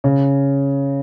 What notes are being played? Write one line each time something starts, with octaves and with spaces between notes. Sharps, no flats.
C#3